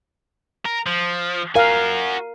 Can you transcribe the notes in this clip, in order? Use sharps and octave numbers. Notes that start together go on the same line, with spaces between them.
A#4
F3
F#4 A#4 F5 G#5